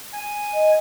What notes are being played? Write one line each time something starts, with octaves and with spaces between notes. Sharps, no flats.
G#5
D#5